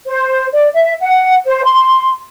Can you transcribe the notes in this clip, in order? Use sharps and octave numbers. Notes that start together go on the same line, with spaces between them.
C5
D5
E5
F#5
C5
C6